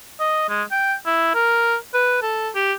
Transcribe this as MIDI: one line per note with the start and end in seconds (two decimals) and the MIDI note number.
0.20 0.45 75
0.49 0.63 56
0.71 0.94 79
1.06 1.31 64
1.35 1.76 70
1.94 2.19 71
2.22 2.49 69
2.55 2.73 67